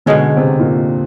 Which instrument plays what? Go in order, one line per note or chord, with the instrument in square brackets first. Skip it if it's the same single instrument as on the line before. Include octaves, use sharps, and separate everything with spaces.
[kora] B2 G#3 C#4 [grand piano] D3
[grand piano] C3
A#2